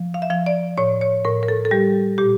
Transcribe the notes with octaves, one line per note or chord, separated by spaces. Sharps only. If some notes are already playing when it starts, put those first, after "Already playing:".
Already playing: F3
F5
E5
F3 F5
D5
A2 C#5
C#5
A2 A#4
A#4
A4
A4
G3 G4
A#2 G4